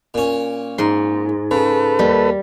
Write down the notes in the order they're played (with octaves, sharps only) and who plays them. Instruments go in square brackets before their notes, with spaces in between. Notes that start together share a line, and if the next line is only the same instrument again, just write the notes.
[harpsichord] A#2 C#4
[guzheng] G#2 C6
[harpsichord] C#3 [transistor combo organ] A4 B4
[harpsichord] D#2 [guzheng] G3